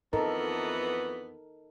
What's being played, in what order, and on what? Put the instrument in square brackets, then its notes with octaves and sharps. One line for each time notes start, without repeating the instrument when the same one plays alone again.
[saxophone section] F2 E3 B3 [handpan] D#4 A4 A#4